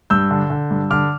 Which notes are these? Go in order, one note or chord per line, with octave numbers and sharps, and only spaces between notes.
G2 E6 G6
D3
D3
G2
D3 D6 F6